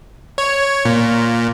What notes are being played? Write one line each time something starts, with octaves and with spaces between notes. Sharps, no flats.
C#5
A#2